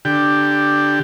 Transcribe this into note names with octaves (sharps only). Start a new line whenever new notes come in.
D3 G4